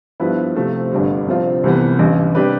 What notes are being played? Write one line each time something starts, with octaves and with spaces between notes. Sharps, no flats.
G2 F3 B3 E4 B4
C3 F3 A3 C4
G1 G2 D3 G3
C2 C3 F3 C4 F4
C2 C3 E3 B3
A1 G2 E3
C3 G3 D4 G4 B4